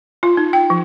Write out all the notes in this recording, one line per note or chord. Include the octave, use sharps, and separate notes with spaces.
F4
D#4
G5
F3